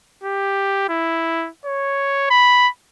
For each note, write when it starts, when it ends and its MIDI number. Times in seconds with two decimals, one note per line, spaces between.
0.24 0.86 67
0.89 1.49 64
1.65 2.28 73
2.30 2.68 83